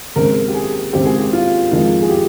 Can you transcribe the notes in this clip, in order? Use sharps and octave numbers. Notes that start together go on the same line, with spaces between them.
D#2 C#3 G#3 C4 A#4
G4
G#4
D#2 C#3 G#3 C4 G4
G#4
G4
F4
F2 D#3 G#3 F4
G#4
G4